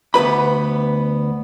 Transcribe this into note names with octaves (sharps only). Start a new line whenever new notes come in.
D2 B3 B4 B5